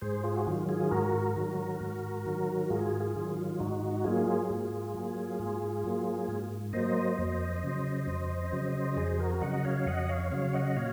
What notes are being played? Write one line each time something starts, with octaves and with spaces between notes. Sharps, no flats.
G#2 G#4 C5
F4 G#4
F#4
D#3 F#3 F4
F4 G#4
G#2 F#4 A#4
D#3 F#3
G#2
D#3 F#3
G#2 F4 G#4
F4 G#4
D#3 F#3
F4
G#2 D#4 F#4
F#3 A#3 F4 G#4
G#2
F#3 A#3
G#2
F#3 A#3
G#2
F#3 A#3 C5 D#5
F2
C#3 F#3
F2
C#3 F#3
F2 G#4 C5
F#4 A#4
C#3 F#3 D#5 F#5
C#5 F5
F2 D#5 F#5
C#5 F5
C#3 F#3 C#5 F5
D#5 F#5
A#2 C#5 F5